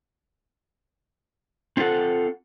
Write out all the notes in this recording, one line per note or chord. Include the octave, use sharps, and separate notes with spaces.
C4 F4 G#4 A4 F#5